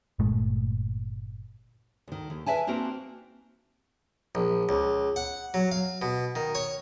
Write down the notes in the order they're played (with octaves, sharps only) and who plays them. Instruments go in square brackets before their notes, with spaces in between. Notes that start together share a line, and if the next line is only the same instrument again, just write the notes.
[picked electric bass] G1 A#2 G#3 A3
[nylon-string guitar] D2 D#3
D#2
A#4 B4 D5 E5 G#5 A5
A#3 C4 D4 F#4 A#4
[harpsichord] A#1
C#2
F#5
F#3
F5
B2
D#3
C#5